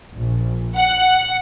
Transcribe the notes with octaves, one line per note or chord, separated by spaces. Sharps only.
A#1
F#5